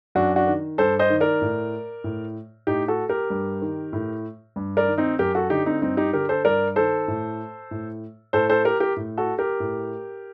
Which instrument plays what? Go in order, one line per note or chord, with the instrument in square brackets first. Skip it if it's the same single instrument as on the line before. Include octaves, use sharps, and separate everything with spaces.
[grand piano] F#2 D4 F#4
D4 F#4
D#3
G2 A4 C5
C5 D#5
D#3
A#4 D5
A2
A2
A2 D#4 G4
F#4 A4
G4 A#4
G2
D#3
A2
G2
A#4 D5
D#3
C4 D#4
F#2 G4 A#4
F#4 A4
D3 D#4 G4
C4 D#4
G2 C4 D#4
D#4 G4
D3 G4 A#4
A4 C5
G2 A#4 D5
D#3 A4 C5
A2
A2
A2 A4 C5
A4 C5
G4 A#4
G4 A#4
A2
F#4 A4
G4 A#4
A2